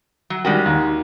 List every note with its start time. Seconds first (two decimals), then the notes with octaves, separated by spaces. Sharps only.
0.30 F#3
0.45 D#3 G3 G#3 C#4 F#4
0.66 D#2